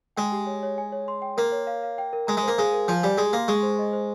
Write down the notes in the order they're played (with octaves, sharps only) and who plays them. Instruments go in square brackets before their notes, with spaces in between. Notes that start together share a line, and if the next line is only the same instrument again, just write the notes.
[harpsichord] G#3 [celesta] G5
[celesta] G4
C#5
C#5
G#5
C#5
C6
G5
[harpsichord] A#3 [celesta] A#4
[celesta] C#5
F5
F5
G5
A#4
[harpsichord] G#3 [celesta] A#5
[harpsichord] G#3
[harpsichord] A#3 [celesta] C5
[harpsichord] G#3 [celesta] F5
[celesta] A#4
[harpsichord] F3 [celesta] G#5
[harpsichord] G3 [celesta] G#5
[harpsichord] G#3 [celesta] G4
[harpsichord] A#3 [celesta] C6
[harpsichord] G#3 [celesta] C#6
[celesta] C5
D#5
C5